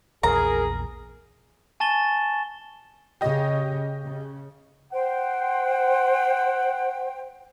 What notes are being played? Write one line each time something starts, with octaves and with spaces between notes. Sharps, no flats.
A#1 E2 G#4 A#4 A#5
G#5 A5 C#6 A6 E7 G7
C#3 G4 D#5
C#3
C5 F#5 G5